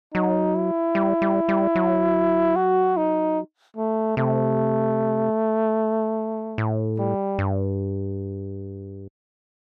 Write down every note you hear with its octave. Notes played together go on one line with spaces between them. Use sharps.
F#3 D#4
E4
G3
G3
G3
F#3
F#4
D#4
A3
C3 A3
A2
G3
G2